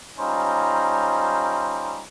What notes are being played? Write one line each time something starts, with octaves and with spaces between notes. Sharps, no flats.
G3 C#4 D#4 F4 C5 A#5